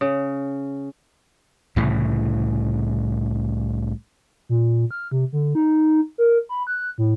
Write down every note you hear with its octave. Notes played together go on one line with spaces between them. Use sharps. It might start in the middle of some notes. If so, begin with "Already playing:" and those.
C#3
C2 A2 C#3 E3
A#2
F6
C3
D3
D#4
A#4
B5
F#6
A2